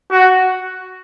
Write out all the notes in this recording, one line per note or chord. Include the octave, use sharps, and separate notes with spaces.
F#4